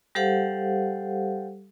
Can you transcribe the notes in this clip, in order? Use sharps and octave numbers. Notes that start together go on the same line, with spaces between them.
G3 G4 A4 C5 F5 F#5